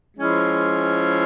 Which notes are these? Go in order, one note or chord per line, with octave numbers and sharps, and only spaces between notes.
F3 G#3 C#4 E4